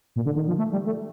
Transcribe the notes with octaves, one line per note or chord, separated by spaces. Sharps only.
A#2
D3
D#3
F3
A3
G3
A3